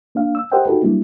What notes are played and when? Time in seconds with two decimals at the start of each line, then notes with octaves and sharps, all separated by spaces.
0.15 A#3 D4 F5
0.35 E6
0.52 G4 A#4 C5 D#5 F#5 G5
0.66 D#4 F#4 G4 A4 B4
0.81 F#3 G3 A#3 D4 E4